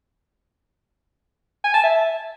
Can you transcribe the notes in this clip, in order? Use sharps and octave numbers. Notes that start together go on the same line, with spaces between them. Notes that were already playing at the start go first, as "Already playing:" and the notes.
G#5
A5
E5